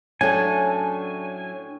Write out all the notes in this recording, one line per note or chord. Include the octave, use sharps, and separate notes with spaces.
A2 F#3 C#4 D4 A4 G5 G#5